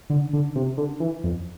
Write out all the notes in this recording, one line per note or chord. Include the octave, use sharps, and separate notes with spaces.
D3
D3
C3
D3
E3
F2